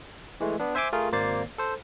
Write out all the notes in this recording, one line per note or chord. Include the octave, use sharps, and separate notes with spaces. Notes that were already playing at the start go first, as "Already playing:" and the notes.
E3 G#3 A3
B3 D4
C5 E5 G#5 C6 D6
A3 F4 G#4 A#4
G#1 A#3 C5 D5 A6 C7
A4 C5